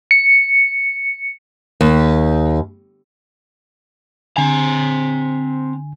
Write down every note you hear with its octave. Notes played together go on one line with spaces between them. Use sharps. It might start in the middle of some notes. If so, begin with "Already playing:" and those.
C#7
D#2
D3 C4 G#5 A#5